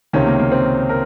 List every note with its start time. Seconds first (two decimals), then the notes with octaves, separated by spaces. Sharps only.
0.13 C#2 C3 D#3 C#4
0.26 A#3
0.39 A#3
0.52 C4
0.89 A#4